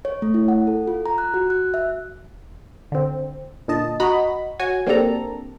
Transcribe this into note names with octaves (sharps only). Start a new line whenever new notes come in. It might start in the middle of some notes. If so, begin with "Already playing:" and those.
C#5
A3
E4
F#5
A4
F4
A#5
F#6
F#4
F#6
E5
D3 C4
A#2 D3 D#5 A5
F#4 D#5 A#5 B5
F#4 C#5 G#5
A#3 C4 D4 G4 A4 A#5